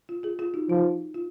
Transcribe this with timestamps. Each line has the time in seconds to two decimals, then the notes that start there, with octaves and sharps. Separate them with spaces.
0.09 F4
0.23 F4 G#4
0.39 F4 G#4
0.54 D#4 F#4
0.69 F3 D#4
1.14 F4